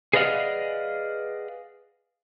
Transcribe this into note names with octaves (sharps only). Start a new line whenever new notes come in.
G#4 B4 D5 D#5 F5 F#5